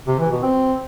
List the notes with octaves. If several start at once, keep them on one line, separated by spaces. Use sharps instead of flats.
C3
E3
B2
C4